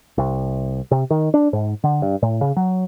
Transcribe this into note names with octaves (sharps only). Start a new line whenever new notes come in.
C2
C3
D#3
D4
G#2
D3
G2
A2
C#3
F#3